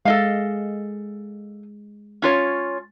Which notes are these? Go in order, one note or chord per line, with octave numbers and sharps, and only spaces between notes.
G#3 A4 D#5 F5
C#4 F4 C#5